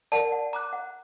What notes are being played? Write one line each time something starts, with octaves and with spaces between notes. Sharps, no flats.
A#4 D5 F#5 A5
F#5
A#5 D6 F#6
F#5